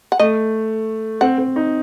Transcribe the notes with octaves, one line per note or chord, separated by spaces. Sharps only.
F#5
A3 D#5
C4 F#5
C4
D#4